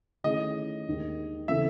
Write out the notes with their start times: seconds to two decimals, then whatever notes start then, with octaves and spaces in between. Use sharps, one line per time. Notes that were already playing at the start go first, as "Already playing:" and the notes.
0.24 D#3 A3 C#4 E4 G#4 D#5
0.87 D#2 D#3 G#3
1.48 C#3 E3 C4 E4 A4 E5